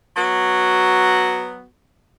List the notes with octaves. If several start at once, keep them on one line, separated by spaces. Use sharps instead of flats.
F#3 B3 F#4